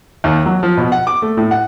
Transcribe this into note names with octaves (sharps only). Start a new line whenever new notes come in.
D#2
F#3
F3
B2
F#5
D6
A3
A2
F#5